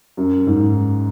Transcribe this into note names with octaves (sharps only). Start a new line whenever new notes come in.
F#2
G#2